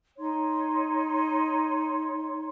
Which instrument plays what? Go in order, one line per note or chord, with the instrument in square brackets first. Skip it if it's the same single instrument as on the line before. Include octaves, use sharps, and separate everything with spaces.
[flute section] D#4 C#5 C6